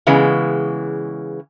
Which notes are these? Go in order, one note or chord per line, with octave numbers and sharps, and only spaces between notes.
C#3 E3 G#3 B3